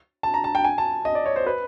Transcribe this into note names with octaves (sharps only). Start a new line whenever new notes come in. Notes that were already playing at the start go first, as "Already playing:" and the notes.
A5
A#5
A5
G5
G#5
A5
D#5
D5
C#5
C5
B4